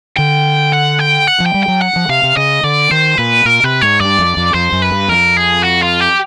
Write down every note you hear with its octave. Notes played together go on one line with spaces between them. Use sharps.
D3 G5
F#5
G5
F#5
F3
G5
G3
F#3 G5
F#5
F3
C3 F5
C3
C#3 D#5
D3 D5
D#3 C5
A#2 B4
A#2 A#4
C3 B4
G#2 C#5
G2 D5
F2
F2
F2 C5
F#2
B4
G2
F2 A#4
G#4
F#4
F4
G4